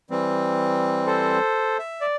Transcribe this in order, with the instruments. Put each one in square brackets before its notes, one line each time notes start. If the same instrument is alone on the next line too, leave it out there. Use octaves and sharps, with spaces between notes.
[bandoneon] E3 G3 C4
[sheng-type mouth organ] A4 C5
[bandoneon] E5
[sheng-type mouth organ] D5